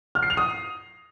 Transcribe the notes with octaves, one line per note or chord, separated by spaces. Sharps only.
F6
C7
F7
D#6